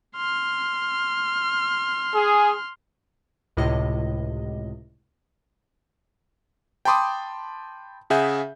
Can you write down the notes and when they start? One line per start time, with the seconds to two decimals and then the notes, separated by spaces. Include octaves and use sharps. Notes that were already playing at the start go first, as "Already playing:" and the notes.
0.16 C6 F6
2.13 G#4
3.57 C#2 A2 C3 D#5
6.85 G5 A5 B5 C6 D6 D#6
8.10 C#3 G#4 E5 F#5 G6